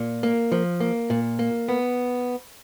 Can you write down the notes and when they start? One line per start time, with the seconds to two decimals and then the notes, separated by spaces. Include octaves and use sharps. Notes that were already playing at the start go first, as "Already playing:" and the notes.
Already playing: A#2
0.23 A#3
0.52 F3
0.80 A#3
1.10 A#2
1.39 A#3
1.69 B3